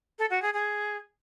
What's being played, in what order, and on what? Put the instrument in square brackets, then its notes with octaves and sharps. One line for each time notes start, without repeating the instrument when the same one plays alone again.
[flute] A4
F#4
G#4
G#4